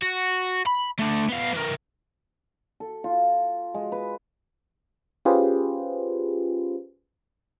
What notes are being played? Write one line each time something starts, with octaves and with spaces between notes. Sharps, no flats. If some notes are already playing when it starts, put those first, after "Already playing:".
F#4
B5
A3 D4
B3 F5
E3 A#4
A4
F4
G#3
B4
C#4 F4 G4 G#4 B4 C5